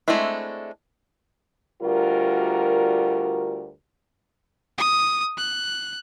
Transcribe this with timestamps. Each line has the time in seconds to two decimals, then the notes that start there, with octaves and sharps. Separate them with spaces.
0.08 G#3 A3 C4 D4 E4
1.82 D2 G3 F4 F#4 A#4
4.78 D#6
5.37 F#6